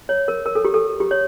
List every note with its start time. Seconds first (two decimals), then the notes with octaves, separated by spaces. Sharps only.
0.09 C#5
0.28 A#4
0.46 A#4
0.55 A4
0.65 G4
0.74 A4
1.00 G4
1.11 C#5